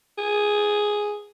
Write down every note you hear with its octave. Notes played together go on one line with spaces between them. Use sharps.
G#4